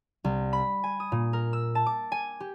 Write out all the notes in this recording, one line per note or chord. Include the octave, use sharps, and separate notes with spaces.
C2
B5
G#5
D#6
A#2
A#4
E6
A5
D6
G#5
G4